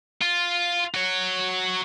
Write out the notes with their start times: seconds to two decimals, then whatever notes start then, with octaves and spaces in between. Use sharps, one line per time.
0.22 F4
0.95 F#4 C#5